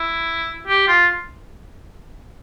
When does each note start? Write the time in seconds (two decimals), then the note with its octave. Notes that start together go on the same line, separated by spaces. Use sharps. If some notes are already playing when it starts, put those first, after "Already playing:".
Already playing: E4
0.67 G4
0.88 F4